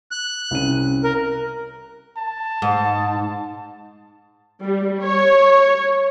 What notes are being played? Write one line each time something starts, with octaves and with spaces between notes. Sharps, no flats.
F#6
C2 C#4 D#7
A#4
A5
G#2
G3
C#5